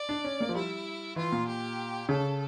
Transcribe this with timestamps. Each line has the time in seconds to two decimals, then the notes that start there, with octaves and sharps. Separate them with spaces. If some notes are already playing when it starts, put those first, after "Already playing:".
Already playing: D5
0.09 D4
0.24 C#4
0.41 A#3
0.49 F3
0.55 G3 E4
1.16 E3 F4
1.32 A#2
1.47 G4
2.09 C#3 A4